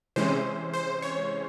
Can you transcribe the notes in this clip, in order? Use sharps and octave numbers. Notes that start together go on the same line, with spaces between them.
C3 E3 G#3 C#4 C5
C5
C#5